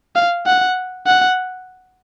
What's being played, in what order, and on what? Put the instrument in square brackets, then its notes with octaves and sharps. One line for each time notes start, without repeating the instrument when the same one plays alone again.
[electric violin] F5
F#5
F#5